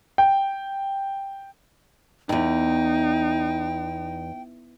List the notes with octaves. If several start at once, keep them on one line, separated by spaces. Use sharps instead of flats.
G5
E2 G2 D#4 G5